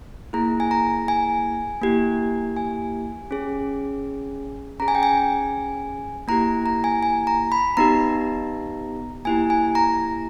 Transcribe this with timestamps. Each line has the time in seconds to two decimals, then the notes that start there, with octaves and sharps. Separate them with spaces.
0.33 A#3 E4 G#4 A#5
0.60 G#5
0.71 A#5
1.08 G#5
1.82 A#3 E4 G4
2.56 G#5
3.31 C#4 G#4
4.80 C#4 G#4 A#5
4.88 G#5
4.95 G5
5.03 G#5
6.28 A#3 E4 G4 A#5
6.66 A#5
6.84 G#5
7.03 G#5
7.27 A#5
7.52 B5
7.77 B3 D#4 G4 A#5
9.25 A#3 E4 G4 G#5
9.50 G#5
9.75 A#5